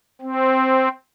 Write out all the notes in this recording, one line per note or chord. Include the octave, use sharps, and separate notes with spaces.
C4